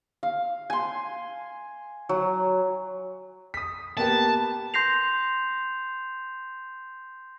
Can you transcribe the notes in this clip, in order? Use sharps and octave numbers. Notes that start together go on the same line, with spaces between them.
F5
G#5 C6
F#3
D#6 B6
A#3 B3 G4 A5
C6 G6 A#6 C7 F7